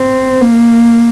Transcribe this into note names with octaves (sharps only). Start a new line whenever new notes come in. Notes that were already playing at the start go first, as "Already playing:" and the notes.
Already playing: C4
A#3